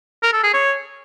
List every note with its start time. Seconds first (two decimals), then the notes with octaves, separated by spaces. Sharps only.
0.23 A#4
0.33 A4
0.43 G#4
0.53 C#5